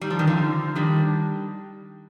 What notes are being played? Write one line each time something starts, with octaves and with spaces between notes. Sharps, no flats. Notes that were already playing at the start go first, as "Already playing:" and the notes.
G3 D#4
F3
D#3
D3 F3
D#3 G3 D4